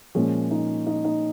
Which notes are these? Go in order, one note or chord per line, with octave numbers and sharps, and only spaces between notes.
A#2 F3 G#3 C#4
D#4
D#4
D#4